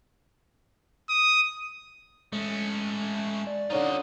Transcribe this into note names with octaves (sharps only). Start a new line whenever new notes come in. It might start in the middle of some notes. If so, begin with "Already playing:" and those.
D#6
G#3 A3 C#4 D#5
D5
D3 C#4 D#4 F4 D#5